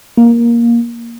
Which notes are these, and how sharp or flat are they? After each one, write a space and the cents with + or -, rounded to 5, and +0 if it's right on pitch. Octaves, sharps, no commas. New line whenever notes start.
A#3 +10